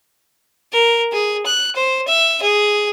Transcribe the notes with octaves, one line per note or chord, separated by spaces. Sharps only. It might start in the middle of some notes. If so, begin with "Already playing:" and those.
A#4
G#4
F#6
C5
E5
G#4